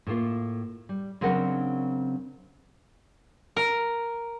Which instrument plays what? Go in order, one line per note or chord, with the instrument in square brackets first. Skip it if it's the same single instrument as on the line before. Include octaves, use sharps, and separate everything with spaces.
[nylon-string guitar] A2 A3 A#3 F4
G3
C#3 F#3 C4 D4 A#4 F#5
[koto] A#4